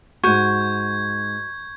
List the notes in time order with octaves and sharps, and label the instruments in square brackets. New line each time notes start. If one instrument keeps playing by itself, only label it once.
[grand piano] G#2 D#7 [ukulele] F#4 [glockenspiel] C#6 G6 [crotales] G#6